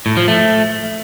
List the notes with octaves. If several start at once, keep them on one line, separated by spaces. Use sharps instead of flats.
A2
F3
A3